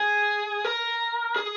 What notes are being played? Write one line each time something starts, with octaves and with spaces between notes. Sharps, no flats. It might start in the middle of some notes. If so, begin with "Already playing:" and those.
Already playing: G#4
A#4
G#4